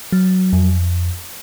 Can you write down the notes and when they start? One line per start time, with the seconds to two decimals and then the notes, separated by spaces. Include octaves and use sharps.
0.12 F#3
0.53 F2